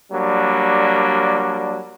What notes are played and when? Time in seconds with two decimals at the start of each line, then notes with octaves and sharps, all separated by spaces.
0.12 F#3 G3 A#3 D4